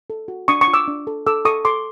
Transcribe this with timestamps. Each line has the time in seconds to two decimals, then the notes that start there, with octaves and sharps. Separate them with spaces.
0.10 A4
0.28 F#4
0.48 D4 C#6 D#6
0.61 C#6 D#6
0.68 F4
0.74 D6 E6
0.88 D4
1.07 A4
1.26 A4 D6 E6
1.45 A4 C#6 D#6
1.65 A4 C6 D6